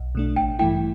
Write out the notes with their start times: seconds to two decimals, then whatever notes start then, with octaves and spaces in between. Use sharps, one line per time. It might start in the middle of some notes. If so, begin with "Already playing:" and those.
Already playing: B1
0.15 B2 A3 D4
0.36 A1 G5
0.59 G2 E3 A3 E4 G5